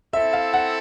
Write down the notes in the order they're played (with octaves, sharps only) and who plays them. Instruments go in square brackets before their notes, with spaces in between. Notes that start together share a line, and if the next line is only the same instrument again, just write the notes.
[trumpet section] C4 E4 A4 [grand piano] E5
[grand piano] F5
F#5